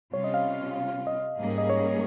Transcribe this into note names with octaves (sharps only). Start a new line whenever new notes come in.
C3 G3 C#4 F4 C#5
D#5
F5
D#5
G#2 G3 A#3 C#4 G#4
D#5
C#5